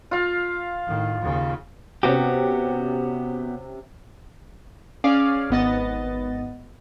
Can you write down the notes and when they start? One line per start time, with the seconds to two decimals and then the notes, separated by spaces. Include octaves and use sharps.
0.11 F4 F5
0.86 A2 D#3
1.21 D#2 C#3
2.03 C3 B3 C#4 F#4 G4
5.04 C#4 G#4 D5 F5
5.50 G#1 B3 D#5 A6